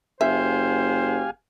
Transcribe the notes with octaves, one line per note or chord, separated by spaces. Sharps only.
F#1 G4 C5 E5 F5 G#5